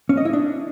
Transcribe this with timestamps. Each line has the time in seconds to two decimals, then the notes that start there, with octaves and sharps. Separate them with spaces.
0.09 C#4
0.17 D#5
0.25 E4
0.33 D4